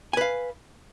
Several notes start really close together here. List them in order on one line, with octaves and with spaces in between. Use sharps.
G#5 B4 F5